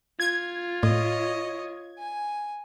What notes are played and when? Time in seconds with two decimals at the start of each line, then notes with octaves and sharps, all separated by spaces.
0.20 F4 G#6
0.83 A2 C#5 D#5
1.98 G#5